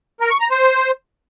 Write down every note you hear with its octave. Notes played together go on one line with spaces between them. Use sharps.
A#4
C#6
A#5
C5